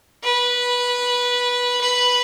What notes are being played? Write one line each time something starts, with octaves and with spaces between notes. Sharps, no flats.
B4
B4